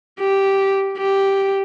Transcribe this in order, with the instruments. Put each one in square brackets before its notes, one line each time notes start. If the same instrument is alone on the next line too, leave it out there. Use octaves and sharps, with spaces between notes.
[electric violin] G4
G4